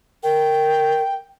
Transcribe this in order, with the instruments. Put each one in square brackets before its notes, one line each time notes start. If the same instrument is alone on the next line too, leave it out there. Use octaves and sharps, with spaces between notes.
[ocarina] A#4 [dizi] G5